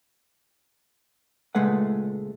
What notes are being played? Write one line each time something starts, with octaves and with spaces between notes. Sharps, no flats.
C#2 A#2 G#3 A3 B4 F#5